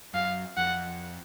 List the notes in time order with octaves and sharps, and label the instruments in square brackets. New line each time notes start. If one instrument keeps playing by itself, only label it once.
[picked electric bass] F#2 [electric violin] F5
[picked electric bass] F2 [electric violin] F#5